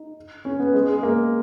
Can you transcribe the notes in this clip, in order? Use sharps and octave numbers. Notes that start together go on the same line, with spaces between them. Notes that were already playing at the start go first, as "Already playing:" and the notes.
Already playing: D#4
C#4
B3
G#3
G#3
A#3